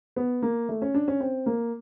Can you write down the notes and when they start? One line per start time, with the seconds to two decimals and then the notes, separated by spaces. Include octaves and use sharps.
0.16 B3
0.42 A#3
0.69 A3
0.82 C#4
0.94 D4
1.08 C#4
1.20 C4
1.46 A#3